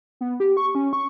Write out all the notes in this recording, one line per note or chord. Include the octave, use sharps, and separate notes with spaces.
B3
G4
C#6
C#4
C#6